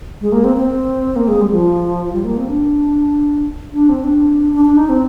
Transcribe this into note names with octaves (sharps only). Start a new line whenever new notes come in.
G#3
A#3
C4
C4
A#3
G#3
G3
F3
G3
A#3
C4
D4
D4
C4
D4
D4
D4
D#4
C4